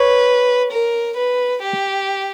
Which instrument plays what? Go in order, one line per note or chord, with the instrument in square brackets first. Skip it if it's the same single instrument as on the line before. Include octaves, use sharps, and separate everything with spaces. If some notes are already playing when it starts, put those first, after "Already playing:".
Already playing: [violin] B4 [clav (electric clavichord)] C#5
[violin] A#4
B4
G4